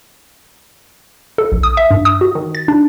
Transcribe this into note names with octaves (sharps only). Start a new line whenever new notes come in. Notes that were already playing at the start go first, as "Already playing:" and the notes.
A4
A#1
D#6
E5
G2
D#6
F#4
D#3
A6
D4